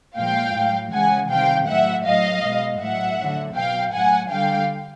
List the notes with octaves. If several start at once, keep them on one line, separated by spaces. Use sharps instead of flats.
A#2 F3 G#3 F5 G5
A2 F#3
C#3 E3 G#3 F#5 G#5
C3 D#3 G3 F5 G5
A2 F#3 E5 F#5
A2 F#3 D#5 F5
B2 G#3
A2 F#3 E5 F#5
D3 F#3
B2 F#3 F5 G5
A2 F#3 F#5 G#5
D3 G3 F5 G5